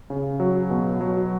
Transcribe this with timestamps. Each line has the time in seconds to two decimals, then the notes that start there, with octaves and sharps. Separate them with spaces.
0.10 C#3
0.40 F#3
0.70 B2
1.01 F#3